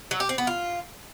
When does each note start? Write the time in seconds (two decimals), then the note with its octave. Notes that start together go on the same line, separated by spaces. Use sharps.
0.11 F#3
0.20 G4
0.29 C4
0.38 B3
0.47 F4